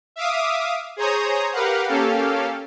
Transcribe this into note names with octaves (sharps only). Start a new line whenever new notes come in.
E5 F5 D6 D#6
G#4 C5 C#5 A#5 D#6
G4 A#4 B4 F5 F#5
A#3 C#4 G4 A4 F5